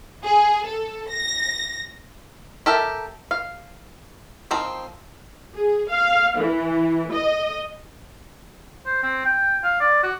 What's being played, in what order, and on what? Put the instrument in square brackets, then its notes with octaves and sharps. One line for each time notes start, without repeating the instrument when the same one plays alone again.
[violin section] G#4
A4
A#6
[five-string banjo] G4 A4 A#4 E5
F5
D#3 F3 C4
[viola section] G#4
F5
E3
D#5
[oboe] C5
C4
G5
F5
D5
F#4